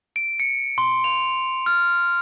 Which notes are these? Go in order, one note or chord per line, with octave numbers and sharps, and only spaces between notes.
D7
C#7
C6
F7
F6